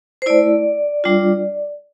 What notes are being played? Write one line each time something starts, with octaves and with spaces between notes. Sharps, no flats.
C5
A3 E4 D5
G3 D4 F4